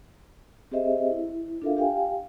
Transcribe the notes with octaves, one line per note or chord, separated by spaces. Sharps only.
C4 G4 G#4 C5 D#5 E5
E4
D4 F4 A4 A#4 E5 F5
G4 F5 G5 G#5